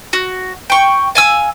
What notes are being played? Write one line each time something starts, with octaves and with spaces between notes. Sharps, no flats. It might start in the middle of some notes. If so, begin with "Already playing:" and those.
F#4
G5 C#6
F5 G#5 E6